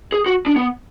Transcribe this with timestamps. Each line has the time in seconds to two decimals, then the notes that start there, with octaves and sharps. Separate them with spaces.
0.12 G#4
0.26 F#4
0.46 D4
0.56 B3